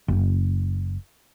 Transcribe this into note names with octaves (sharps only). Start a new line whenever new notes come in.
F#1